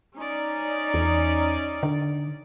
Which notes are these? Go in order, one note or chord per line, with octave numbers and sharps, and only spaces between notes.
C#4 D#4 D5
E2
D3